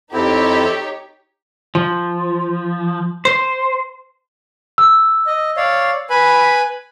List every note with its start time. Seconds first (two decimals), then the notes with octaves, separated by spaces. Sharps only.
0.13 F2 C4 D#4 E4 G4 A4 C#5
1.75 F3
3.25 C5
4.78 E6
5.27 D#5
5.57 C#5 D5 F5
6.10 B4 G#5 B5